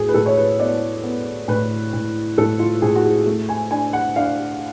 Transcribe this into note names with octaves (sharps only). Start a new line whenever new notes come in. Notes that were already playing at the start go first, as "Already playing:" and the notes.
Already playing: A2 F#4 G#4
B4
A2 A4
C#5
B4
B3 D5
B3
A2 B4
A2
A2 A4
F4
A2 G#4
F#4
G#4
A3
G#5
D4 G#5
F#5
D4 F5